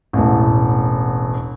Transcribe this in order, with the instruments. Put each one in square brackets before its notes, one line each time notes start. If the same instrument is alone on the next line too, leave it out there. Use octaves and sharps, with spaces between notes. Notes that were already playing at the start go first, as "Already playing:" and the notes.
[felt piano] E1 A1